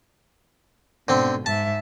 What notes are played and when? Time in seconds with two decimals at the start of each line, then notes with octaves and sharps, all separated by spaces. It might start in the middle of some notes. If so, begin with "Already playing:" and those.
1.08 G#2 B2 D3 C4
1.46 G#2 E5 A5